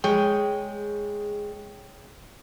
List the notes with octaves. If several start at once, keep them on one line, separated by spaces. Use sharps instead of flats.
G#3 G#4 C#5 G5